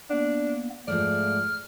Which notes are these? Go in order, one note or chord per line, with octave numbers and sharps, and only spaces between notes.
A#3 B3 D4
G#2 F3 A3 D5 F6